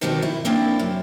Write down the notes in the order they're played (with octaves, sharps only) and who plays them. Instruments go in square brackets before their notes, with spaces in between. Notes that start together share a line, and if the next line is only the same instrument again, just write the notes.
[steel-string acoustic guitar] B2 D#3 G3 C4 D#4 F#4
E4
A#3 C4 D4 E4
F#2 C3